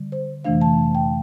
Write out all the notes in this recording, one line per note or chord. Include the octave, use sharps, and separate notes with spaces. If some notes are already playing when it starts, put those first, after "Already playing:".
Already playing: D3 G3
C5
F2 C3 E3 A3 D4 F5
A5
G5